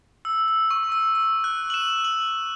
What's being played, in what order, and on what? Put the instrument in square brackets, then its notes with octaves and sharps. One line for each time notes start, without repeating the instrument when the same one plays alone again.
[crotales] E6
E6
C#6
E6
E6
F#6
F#7
E7
F#7